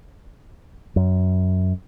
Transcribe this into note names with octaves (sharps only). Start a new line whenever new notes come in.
F#2